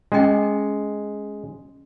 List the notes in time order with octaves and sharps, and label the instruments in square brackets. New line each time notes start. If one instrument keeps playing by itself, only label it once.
[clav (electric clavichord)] G#3 [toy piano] C#4 G#4 D#5 G5